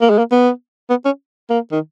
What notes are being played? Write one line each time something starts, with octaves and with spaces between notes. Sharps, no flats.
A#3
G#3
A#3
B3
B3
C#4
A#3
D#3